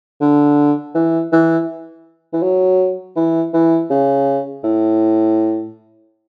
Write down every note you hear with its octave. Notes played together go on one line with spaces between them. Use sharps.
D3
E3
E3
E3
F#3
E3
E3
C#3
A2